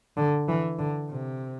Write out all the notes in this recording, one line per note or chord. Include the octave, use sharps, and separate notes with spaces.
D3
E3
D3
C3